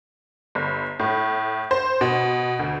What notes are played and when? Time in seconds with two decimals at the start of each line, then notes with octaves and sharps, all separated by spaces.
0.55 G1
1.00 A2
1.71 C5
2.01 B2
2.59 D2